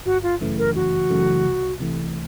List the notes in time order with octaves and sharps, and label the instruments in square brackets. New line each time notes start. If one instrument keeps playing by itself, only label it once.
[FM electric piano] G1 [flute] F#4
[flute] F4
[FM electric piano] F#2 C#3 E3 A3
[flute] A#4
[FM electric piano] G1 [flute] F#4
[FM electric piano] F#2 C#3 E3 A3
C2
C3 E3 A3